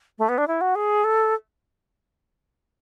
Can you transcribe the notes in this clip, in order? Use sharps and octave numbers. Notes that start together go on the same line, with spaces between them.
A3
B3
D4
E4
F#4
G#4
A4